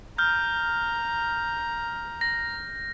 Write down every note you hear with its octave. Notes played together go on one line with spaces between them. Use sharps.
A#5 F6 G6
A#6